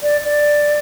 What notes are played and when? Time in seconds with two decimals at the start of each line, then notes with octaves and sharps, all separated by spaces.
0.03 D5
0.24 D5